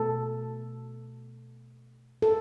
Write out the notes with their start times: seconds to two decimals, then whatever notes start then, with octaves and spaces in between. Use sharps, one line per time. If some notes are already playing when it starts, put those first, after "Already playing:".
Already playing: B2 A3 A4
2.22 A4